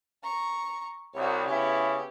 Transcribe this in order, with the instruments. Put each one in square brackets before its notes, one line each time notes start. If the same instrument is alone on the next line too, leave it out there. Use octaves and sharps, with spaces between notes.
[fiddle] A#5 C#6
[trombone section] C2 [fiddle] F#4 C#5
[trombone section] C#3 C#4 E4 [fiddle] B3 G4